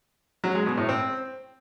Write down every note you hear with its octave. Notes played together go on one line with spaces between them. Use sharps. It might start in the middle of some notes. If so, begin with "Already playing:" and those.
F#3
G#3
B2
A2
C4